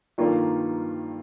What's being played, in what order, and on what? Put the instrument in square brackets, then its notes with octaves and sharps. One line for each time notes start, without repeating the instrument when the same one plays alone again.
[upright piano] G2 D#3 A#3 F4 A4